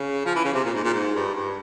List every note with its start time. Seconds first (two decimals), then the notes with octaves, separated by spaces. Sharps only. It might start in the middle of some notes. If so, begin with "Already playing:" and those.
Already playing: C#3
0.26 F3
0.36 E3
0.45 C#3
0.54 C3
0.64 A#2
0.75 G#2
0.84 A#2
0.94 G#2
1.15 G2
1.35 G2